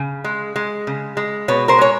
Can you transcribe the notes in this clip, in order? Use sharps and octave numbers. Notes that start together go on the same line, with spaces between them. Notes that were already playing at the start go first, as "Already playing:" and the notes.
Already playing: C#3
G#3
G#3
C#3
G#3
B2 B4 C#5
A#4 C5
G#3 C#5